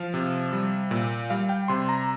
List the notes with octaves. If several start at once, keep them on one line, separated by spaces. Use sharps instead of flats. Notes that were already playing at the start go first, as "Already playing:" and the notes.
Already playing: F3 F5
C3
G3
A#2
G3 F5
G5
C3 C6
A#5